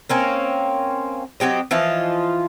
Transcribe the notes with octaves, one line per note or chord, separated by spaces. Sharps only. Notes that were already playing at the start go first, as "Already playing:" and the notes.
A#3 C4 C#4
F#3 C4 G4 D#5
E3 F3 F4 D#5